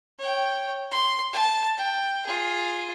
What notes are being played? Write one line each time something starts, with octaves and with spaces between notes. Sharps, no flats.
C#5 G5
C6
A5
G5
F4 G#4